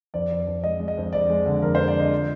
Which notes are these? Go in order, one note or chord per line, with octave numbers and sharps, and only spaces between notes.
F2 D5
F2
F2
G#3 D#5
G#3
D#5
F2
F2 D5
G#3
D3
F2 A#4
G#3 C5
D5
D3 D#5
F3